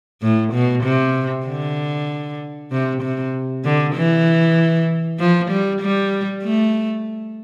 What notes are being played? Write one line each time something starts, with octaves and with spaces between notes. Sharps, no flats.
A2
B2
C3
D3
C3
C3
D3
E3
F3
G3
G3
A3